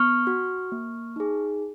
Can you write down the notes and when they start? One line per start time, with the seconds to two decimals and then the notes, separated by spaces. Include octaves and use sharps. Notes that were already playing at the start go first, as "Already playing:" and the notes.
Already playing: B3 C#6 F6
0.27 F#4
0.72 A#3
1.16 D#4 G#4